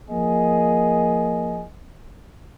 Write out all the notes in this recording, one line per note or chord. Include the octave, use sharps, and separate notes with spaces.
F3 A#3 G#4 D#5